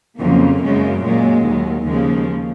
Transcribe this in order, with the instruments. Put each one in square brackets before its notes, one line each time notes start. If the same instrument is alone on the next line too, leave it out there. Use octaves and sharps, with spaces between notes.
[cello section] F2 C#3 F#3 A#3
F#2 C#3 G#3
A#2 F#3 G#3
D#2 D#3 F#3
D#2 C#3 F3 G#3 A#3